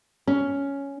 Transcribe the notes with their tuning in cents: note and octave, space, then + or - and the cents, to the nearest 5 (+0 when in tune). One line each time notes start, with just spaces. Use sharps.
C#4 +5